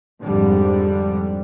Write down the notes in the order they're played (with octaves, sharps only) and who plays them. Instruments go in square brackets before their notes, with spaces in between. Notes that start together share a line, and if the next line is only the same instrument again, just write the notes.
[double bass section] F2 G#2 D3 G3